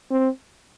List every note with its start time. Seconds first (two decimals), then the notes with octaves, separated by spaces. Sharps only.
0.11 C4